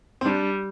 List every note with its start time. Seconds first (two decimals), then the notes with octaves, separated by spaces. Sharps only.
0.21 C4
0.25 G3 D4